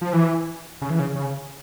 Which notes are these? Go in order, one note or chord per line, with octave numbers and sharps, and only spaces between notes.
F3
E3
C#3
E3
C#3
C#3